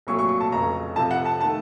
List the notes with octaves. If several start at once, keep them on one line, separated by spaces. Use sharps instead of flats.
C2 A#2 F#3 A3 C#6
C#6
C#6
A5
F1 F2 C#3 A#5
F2 C3 F3 C4 A5
F#5
A5
D#3 A3 A5